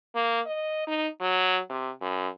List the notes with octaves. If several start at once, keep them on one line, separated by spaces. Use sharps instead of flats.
A#3
D#5
D#4
F#3
C3
F#2